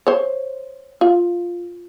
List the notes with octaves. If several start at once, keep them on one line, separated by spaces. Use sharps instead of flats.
C5 C#5
F4